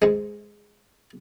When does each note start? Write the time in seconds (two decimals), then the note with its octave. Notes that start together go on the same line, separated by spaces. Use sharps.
0.02 G#2 G#3